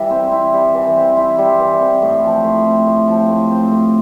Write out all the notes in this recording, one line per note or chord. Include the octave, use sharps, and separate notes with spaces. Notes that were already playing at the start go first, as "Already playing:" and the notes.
Already playing: E3 G3 E4
C4
E4
G3
E3
C4
E4
G3
E3
C4
A2
F3
A2
C4
A2
F3
A2
C4
A2